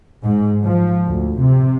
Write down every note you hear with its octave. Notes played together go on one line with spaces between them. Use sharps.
G#2
F3
D2
C3